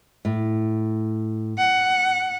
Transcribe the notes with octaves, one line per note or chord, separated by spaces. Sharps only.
A2
F#5